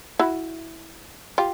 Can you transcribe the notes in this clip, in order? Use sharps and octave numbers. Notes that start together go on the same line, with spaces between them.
E4 F#4
F4 G4